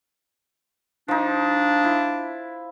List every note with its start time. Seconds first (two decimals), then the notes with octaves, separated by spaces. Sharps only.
1.08 F3 D4 D#4
1.84 E4